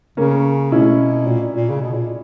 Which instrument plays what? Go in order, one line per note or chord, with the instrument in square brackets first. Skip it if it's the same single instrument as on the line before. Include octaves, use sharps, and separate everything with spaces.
[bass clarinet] C#3 [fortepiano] A#3 C#4
[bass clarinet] B2 [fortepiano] C#4 E4
[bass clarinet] A#2
A#2
C#3
B2
A#2